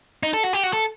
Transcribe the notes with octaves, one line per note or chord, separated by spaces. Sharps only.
D#4
A4
F#4
G4
F#4
A4